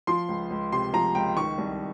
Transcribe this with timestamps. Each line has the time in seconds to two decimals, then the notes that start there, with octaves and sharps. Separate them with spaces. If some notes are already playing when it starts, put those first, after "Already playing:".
0.07 F3 C6
0.29 C#2
0.50 C#2
0.72 C3 C6
0.93 F3 A#5
1.15 C#2 G5
1.36 D#3 C#6
1.58 C2